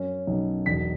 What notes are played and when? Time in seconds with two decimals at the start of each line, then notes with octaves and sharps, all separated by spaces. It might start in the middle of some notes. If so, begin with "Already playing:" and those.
Already playing: F#2 C#4
0.27 B1
0.66 E1 B6